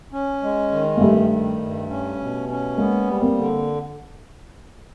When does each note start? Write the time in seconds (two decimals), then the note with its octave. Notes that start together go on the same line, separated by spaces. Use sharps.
0.12 C#4
0.42 G#3
0.71 D#3
0.97 A#3
1.01 G2 G3 A3
1.30 D#3
1.60 G2
1.90 C#4
2.19 B2
2.49 C#4
2.77 G#3 A#3 B3
3.07 G3
3.22 A#3 C4
3.37 D3